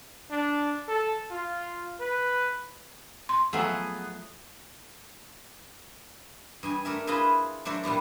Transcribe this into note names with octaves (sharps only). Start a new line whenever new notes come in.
D4
A4
F4
B4
C6
F3 F#3 A3 B3 G#4 D#5
G2 G#4 G#5
A3 D4 A#4 E5
E4 F4 G#4 B4 D#5 E5
F#3 D4 C5 D5 E5
A#2 G3 B3 E4